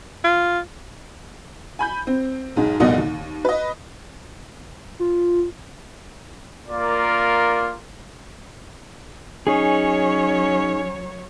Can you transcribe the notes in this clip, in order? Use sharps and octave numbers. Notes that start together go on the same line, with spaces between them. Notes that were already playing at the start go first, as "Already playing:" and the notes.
F4
G#5 B5 G6
C4
B1 G#2 G#3
F1 C2 A#2 A#3 B3 D#5
D#2
B4 D#5
F4
A#3 F4 A#4 D5
F#3 C#4 D#4 G#4 C#5